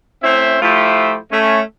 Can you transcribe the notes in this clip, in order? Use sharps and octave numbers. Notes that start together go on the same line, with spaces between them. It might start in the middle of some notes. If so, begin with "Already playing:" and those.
A3 C4 C#4 E4 C5 E5
F3 A3 E4 F4 G4 C5
A3 C#4